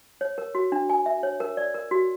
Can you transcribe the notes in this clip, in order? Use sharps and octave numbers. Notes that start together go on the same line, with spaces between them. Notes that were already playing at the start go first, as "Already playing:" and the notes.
C#5
A#4
F#4
D4
G#5
E5
C#5
A#4
D5
A#4
F#4